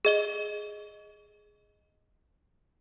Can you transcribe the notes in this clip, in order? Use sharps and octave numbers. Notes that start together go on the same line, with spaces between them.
G#4 D#5 G7